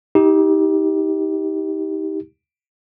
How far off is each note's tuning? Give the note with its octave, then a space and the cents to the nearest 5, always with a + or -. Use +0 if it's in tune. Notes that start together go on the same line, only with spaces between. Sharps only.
D#4 +35 G4 +0